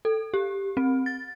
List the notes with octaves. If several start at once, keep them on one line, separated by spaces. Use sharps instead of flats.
A4
G4
C4
A6